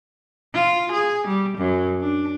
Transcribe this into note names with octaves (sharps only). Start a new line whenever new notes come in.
F4
G#4
G3
F#2
D4